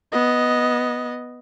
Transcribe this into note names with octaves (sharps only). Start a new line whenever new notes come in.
B3 D#5